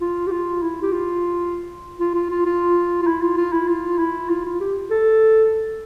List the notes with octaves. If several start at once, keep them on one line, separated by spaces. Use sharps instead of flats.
F4
G4
F4
E4
G4
F4
F4
F4
F4
F4
F4
E4
F4
F4
E4
F4
E4
F4
F4
G4
A4